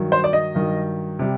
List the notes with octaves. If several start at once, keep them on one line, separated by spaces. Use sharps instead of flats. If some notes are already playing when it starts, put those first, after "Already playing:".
Already playing: G2 D#3 F#3
C5
D5
D#5
G2 D#3 F#3
C3 G3